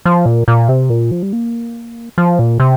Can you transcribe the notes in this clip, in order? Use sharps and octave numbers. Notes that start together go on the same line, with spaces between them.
F3
A#2
A#2
C3
A#2
F3
G3
A#3
F3
A#2
C3